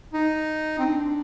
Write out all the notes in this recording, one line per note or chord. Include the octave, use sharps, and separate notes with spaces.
D#4
C4
D4